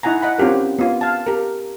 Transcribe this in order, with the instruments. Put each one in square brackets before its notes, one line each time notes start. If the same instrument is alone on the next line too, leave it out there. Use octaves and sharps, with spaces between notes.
[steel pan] D#4 E4 F#5 G#5 A#5
D#5 F#5 B5
C4 C#4 F4 G4 A#4
B3 F4
F5 A5
G4 A#4